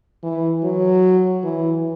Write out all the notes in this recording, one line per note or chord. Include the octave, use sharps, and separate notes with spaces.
E3
F#3
E3